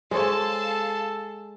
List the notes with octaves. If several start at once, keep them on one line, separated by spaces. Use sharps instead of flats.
G#3 G#4 A4 C5 C#5 F5 A5